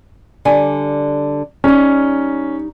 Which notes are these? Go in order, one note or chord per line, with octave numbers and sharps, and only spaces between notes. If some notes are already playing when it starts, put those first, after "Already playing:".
D3 G3 G#5
G3 C#4 D#4